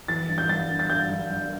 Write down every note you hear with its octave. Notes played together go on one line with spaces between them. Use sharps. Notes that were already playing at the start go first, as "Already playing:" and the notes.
E3 A6
G2
G6
G2 A6
G2
A6
G2 G6
G2
G2